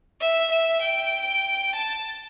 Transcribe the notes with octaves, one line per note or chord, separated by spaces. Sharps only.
E5
E5
G5
A5